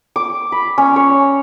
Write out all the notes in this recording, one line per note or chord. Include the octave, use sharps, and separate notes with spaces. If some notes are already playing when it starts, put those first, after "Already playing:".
D6
B5
C#4
C#5